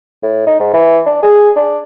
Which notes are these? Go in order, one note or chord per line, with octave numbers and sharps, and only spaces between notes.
A2
D#4
G#2
E3
D4
G#4
D4